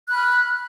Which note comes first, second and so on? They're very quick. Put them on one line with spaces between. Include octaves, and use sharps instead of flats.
F#6 B5 F6